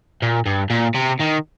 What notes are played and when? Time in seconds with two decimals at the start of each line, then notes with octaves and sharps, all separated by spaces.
0.22 A#2
0.46 G2
0.70 A#2
0.94 C3
1.19 D#3